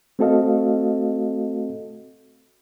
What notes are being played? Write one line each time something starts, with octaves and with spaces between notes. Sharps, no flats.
A3 C4 F#4 A4 D#5 F5